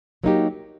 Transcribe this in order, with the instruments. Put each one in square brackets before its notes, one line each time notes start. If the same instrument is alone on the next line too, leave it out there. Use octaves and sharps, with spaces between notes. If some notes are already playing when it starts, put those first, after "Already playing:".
[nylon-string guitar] F#3 A#3 D#4 G4